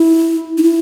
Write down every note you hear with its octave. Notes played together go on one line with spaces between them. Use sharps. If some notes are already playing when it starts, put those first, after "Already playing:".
Already playing: E4
D#4
E4